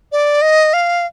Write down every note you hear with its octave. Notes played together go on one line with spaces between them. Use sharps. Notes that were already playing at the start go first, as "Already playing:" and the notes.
D5
D#5
F5